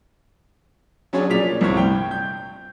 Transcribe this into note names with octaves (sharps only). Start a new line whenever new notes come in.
F#3 C#4 D4 G#4 C#5 D5
A#2 F3 D5 B6 F7
C2 G2 C3 C4 C#6 G#6
G5
G6